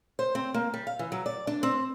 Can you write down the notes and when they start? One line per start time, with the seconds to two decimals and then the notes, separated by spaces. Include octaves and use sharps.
0.19 C5
0.35 C4
0.54 A#3
0.74 G3
0.87 F5
0.99 E3
1.12 F#3
1.26 D5
1.47 D4
1.63 C4